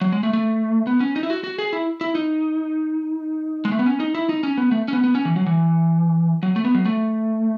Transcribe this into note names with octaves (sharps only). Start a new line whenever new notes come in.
F#3
G#3
A3
A3
B3
C#4
D#4
E4
F#4
F#4
G#4
E4
E4
D#4
G#3
A3
B3
C#4
D#4
E4
D#4
C#4
B3
A3
C#4
B3
B3
C#4
E3
F#3
E3
F#3
A3
B3
F#3
A3